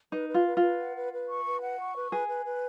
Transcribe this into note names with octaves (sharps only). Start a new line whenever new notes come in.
D#4 B4
B4
F4
B4
F4
B4
F#5
B4
B4
C#6
B4
F#5
C#6
B4
G#4 B4
B4
B4